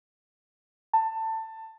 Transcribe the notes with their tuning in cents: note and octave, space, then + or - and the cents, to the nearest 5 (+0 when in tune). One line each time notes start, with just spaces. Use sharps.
A5 +20